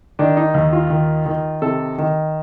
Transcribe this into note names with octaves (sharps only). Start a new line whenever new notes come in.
D#3 D4
D#4
D#2
F4
D#3
D#3
C3 A4
D#3